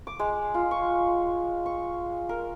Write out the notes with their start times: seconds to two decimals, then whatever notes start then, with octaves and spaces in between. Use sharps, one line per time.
0.07 D6
0.19 G#3
0.54 F4
0.71 C#6
1.66 C#6
2.29 A#4